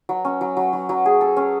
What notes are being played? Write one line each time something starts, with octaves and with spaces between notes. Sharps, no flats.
F#3
C#4
F#3
F#3
F#3
F#3
G#4
A4
C#4